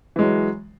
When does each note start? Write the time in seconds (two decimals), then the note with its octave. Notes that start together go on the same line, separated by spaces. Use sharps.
0.16 E3
0.19 G#3
0.22 F#3